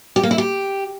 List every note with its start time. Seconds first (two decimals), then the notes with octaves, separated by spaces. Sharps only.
0.16 G4
0.23 A#3
0.31 E4
0.38 G4